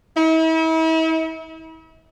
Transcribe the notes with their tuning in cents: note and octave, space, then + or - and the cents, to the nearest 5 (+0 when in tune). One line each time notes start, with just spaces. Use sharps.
E4 -40